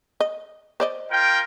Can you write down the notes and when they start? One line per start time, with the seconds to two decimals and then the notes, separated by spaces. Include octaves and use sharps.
0.20 D#5
0.80 C5 D5 D#5
1.11 F4 A#4 G5